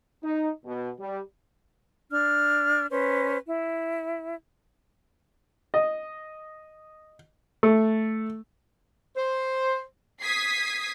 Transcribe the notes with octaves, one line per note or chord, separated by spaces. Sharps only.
D#4
B2
G3
D4 F6
C#4 B4 C5
E4
D#5
A3
C5
D#6 G#6 B6 C7